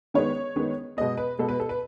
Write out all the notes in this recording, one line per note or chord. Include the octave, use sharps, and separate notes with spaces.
D#3 G#3 B3 C#5
D#3 G#3 B3
B2 G#3 B3 D#5
B4
B2 G#3 B3 A4
B4
A4
B4